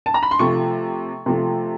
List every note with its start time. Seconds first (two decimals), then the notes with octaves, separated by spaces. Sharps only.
0.06 A5
0.14 A#5
0.23 B5
0.31 C6
0.39 C3 F3 A3 C#6
1.26 C3 F3 A3